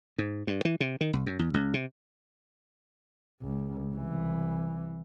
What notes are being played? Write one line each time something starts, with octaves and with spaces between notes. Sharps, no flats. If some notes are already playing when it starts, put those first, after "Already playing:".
G#2
G2
E3
C3
D#3
C2
F#2
E2
C#2
C3
C#2
C2 E3